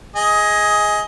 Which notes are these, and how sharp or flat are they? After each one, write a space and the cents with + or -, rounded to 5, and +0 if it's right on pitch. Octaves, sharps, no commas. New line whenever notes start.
G#4 +0 D#5 +20